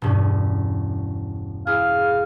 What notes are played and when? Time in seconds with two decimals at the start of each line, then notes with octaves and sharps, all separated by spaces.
0.02 E1 G2 C#4
1.67 E4 G#4 F5